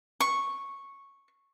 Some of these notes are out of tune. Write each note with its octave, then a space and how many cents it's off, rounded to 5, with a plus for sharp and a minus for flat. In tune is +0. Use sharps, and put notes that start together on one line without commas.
C#6 -5